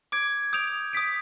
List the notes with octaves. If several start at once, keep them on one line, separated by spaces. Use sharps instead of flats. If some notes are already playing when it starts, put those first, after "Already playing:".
D6 G#6 D7
D#6 G6 D7 F7
D#6 B6 D7